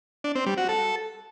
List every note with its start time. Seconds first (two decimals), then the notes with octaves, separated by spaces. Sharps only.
0.24 D4
0.35 C4
0.46 G3
0.58 F#4
0.69 A4